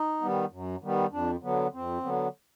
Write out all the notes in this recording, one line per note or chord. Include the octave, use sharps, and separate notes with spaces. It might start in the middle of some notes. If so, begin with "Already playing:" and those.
Already playing: D#4
D#3 G3 B3
F#2
D#3 G3 B3
F2 D4
D3 F#3 B3
F2 C4
D3 F#3 B3